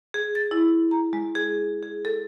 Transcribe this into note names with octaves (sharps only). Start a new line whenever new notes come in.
G#4
A6
E4
A#5
G#3
G#4
G#4
A4